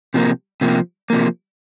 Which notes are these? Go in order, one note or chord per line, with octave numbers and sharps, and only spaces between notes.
C3 F3 A#3
C3 F3 A#3
C3 F3 A#3